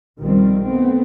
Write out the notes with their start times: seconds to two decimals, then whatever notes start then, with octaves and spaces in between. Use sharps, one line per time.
0.19 B1 D#3 F3 G3 C4
0.63 A3 B3 C4